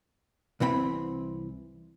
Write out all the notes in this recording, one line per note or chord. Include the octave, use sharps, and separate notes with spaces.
C2 E3 C4 B5